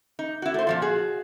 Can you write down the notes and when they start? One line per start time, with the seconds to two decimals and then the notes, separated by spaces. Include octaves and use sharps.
0.19 D#4
0.42 E4 F#4
0.54 A3 C5
0.67 A#2 F3 F4
0.82 F#4 G#4